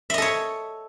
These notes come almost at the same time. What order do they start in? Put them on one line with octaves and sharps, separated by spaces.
E5 D#5 A4 C#5